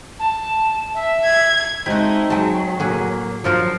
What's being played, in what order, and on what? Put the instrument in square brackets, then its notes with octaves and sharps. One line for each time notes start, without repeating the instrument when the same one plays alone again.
[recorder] A5
E5
[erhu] G#6
[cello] G#3 [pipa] A3 G4 [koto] C4 F#4 [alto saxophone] D#4
[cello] F#3 [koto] G#3 [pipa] A4 G5 A5
[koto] A2 F#4 G#4 [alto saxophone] A#3
[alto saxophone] F3 [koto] F#3 F4 A#4 [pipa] D4